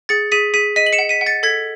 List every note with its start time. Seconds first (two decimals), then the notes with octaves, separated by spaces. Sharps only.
0.09 G#4 A6 C#7
0.32 G#4 B6 D#7
0.54 G#4 B6 D#7
0.76 D#5 B6 D#7
0.86 F#7
0.93 C#7 E7
0.99 F#5
1.09 B6 D#7
1.21 F#5
1.26 A6 C#7
1.43 A4 G#6 B6